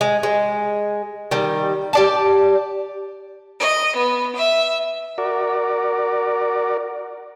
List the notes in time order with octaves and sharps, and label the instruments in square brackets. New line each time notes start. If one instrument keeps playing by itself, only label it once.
[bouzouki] G#3
G#3
D#3 G3
G4 D5 A5
[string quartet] D#5
B3
E5
[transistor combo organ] F#4 A#4 D5